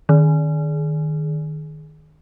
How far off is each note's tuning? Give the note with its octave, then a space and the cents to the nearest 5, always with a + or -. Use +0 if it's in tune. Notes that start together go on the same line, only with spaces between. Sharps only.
D#3 -20